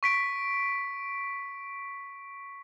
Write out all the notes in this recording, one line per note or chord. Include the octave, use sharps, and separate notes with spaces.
C#6 B6 D7